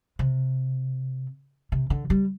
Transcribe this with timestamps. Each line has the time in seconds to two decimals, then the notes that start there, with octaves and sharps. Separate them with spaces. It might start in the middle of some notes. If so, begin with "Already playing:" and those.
0.19 C3
1.72 C3
1.90 D3
2.10 G3